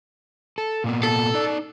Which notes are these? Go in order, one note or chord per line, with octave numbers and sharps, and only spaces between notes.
A4
A#2 A#3 B3
A4
D#4 D5